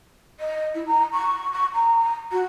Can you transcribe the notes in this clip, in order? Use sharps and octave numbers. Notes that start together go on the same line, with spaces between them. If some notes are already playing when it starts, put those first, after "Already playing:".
D#5
E4
A#5
C#6
C#6
A#5
F#4